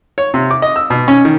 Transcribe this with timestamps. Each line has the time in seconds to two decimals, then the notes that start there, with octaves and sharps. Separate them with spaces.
0.18 C#5
0.34 C3
0.51 D6
0.62 D#5
0.76 E6
0.90 B2
1.08 C#4
1.25 D#3